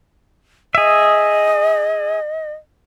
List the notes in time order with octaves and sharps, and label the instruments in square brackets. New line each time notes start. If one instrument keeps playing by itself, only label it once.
[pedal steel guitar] G#4 E5 [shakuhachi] D#5